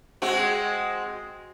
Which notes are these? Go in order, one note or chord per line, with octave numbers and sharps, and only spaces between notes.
G#3 C4 F#4